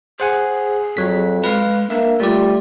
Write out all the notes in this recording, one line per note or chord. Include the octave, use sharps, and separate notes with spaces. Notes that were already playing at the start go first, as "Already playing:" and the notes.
G#4 C5 F#5 G#5
F2 F#3 B6
G#3 B4 F5
A#3 D4 E5
G3 A3 F4 D5